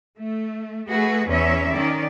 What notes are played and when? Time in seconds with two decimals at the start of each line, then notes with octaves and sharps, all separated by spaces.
0.19 A3
0.89 A3 F#4 G#4 B4
1.29 E2 C#4 C#5 E5
1.74 D#3 C#4 D5